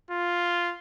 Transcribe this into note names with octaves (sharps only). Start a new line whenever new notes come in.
F4